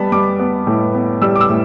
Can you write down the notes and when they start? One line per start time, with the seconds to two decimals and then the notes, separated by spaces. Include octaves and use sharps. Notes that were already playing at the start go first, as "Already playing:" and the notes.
Already playing: G3 B3 A5 B5
0.12 G3 D6
0.39 B3
0.67 A2
0.94 B3
1.22 G3 E6
1.36 D6
1.41 E6
1.49 A2